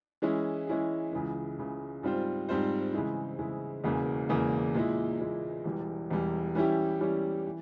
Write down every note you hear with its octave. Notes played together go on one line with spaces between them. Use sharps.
E3 G#3 C#4 E4 G#4
E3 G#3 C#4 E4 G#4
C#2 C#3 E3
C#2 C#3 E3
G#2 G3 C4 F4 C5
G#2 G3 C4 F4 C5
C#3 E3 G#3 E4
C#3 E3 G#3 E4
E1 E2 C#3 E3 A#3
E1 E2 C#3 E3 A#3
A#2 G#3 E4
A#2 G#3 E4
E1 E2 E3 G3
E1 E2 E3 G3
E3 G3 C#4 E4 G4
E3 G3 C#4 E4 G4
E3